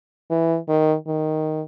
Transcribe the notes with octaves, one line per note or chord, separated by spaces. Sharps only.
E3
D#3
D#3